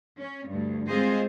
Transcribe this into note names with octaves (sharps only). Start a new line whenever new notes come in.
C#4
D2 G2
G#3 C4 F4 G#4 C5 D#5